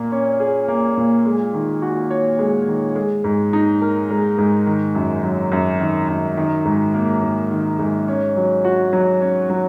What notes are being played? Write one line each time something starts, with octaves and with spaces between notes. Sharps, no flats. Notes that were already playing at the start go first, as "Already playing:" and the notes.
Already playing: A#2 A#3
C#4
G#4
A#3
A#2
G#3
D#3
F#4
C#5
G#3
D#3
G#3
G#2
D#4
A#4
G#3
G#2
D#3
F#2
F#3
F#2
D#3
F#2
D#3
G#2
A#3
G#2
D#3
G#2
C#4
F#3
F#4
F#3
C#4
F#3